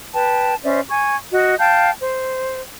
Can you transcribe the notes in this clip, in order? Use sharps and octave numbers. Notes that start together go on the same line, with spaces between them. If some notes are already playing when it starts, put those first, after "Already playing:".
B4 G5 A5
C#4 C5 D5 E5
G#5 C#6 G#6
F#4 D#5
F5 G5 A5 G6
C5